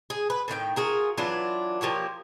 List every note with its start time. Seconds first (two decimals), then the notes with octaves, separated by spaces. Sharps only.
0.10 G#4
0.30 B4
0.48 A2 D#3 F4 G5
0.76 F4 F#4 G#4 A#4
1.18 E3 F#3 D4 F4
1.81 F3 A#3 G4 C#5